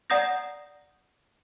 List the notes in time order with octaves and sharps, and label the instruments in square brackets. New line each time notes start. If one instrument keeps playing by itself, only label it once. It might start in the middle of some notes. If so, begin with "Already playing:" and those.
[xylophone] D5 F#5 A#5 D#6 G6 A#6